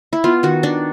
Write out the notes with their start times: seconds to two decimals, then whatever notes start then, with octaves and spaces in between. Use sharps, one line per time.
0.13 E4
0.24 B3 F4
0.43 D#3 F#4
0.63 D#3 D4